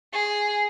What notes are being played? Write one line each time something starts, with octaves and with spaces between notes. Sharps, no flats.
G#4